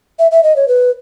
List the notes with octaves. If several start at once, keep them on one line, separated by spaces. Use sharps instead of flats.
E5
E5
D#5
C#5
B4